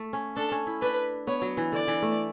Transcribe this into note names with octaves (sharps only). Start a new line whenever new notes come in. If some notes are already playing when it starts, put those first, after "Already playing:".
Already playing: A3
C#4
D4 A4
C#4
E4
D4 B4
B3 C#5
F#3
E3
D3 D5
E3
A3